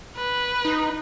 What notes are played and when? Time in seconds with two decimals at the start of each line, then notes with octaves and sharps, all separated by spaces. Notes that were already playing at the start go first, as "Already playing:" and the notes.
0.17 B4
0.65 D#4